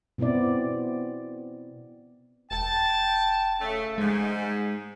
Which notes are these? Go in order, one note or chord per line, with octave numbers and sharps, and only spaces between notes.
B2 B3 C4 E4 D5
E1 G5 A5
C#3 A3
G#2 G#3